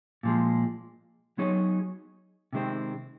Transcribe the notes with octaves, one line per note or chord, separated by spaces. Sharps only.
A#2 F3 G#3
F#3 B3 D#4 G#4 C#5
C3 D#3 G#3 C4